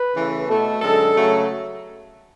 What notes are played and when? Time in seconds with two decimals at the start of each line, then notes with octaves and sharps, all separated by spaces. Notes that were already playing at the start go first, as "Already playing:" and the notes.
Already playing: B4
0.14 C#3 E3 A3
0.48 B2 A3 A4
0.81 F#2 D3 G#3 A4
1.15 C#3 F#3 A3